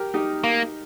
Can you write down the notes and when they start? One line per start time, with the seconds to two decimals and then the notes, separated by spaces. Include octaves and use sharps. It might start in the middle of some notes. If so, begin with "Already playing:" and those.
Already playing: G4 A#4
0.14 D#4 G4
0.44 A#3